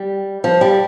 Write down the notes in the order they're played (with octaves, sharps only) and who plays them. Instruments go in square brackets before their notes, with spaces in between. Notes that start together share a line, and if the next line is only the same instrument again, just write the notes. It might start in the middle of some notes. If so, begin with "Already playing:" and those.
Already playing: [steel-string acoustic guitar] G3
F3
G3